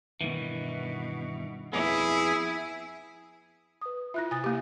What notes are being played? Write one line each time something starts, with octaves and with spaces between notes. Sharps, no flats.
G2 B2 D#3 E3
F2 B3 E4 G#4
B4 D#6
E4 F4 E5 F#6 A#6
C3 G#5 D#6 A6
A#3 G4